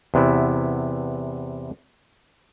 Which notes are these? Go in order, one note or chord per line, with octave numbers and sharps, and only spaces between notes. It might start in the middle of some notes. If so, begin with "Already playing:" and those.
E2 C3 B3 E4